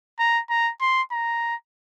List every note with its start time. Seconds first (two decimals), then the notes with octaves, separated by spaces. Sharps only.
0.19 A#5
0.50 A#5
0.81 C6
1.12 A#5